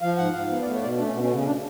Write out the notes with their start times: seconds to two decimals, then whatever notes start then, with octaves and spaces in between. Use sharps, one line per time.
0.02 F3 F5
0.18 G#2 F#5
0.34 G#2 F5
0.50 B3
0.62 D5
0.66 A3 F5
0.74 C#5
0.82 B2 D5
0.98 A3 D4
1.06 C#4
1.14 B2 B3
1.22 C#4
1.30 C#3 B3
1.38 C#4
1.46 D4